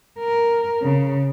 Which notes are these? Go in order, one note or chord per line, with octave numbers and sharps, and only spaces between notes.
A#4
C#3